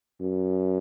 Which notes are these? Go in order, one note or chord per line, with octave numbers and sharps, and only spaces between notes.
F#2